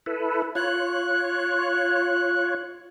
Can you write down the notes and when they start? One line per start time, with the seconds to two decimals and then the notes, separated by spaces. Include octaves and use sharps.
0.06 E4 A4 B4
0.55 F4 C#5 F#6